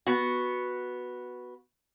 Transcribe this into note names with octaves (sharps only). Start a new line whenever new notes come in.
B3 F#4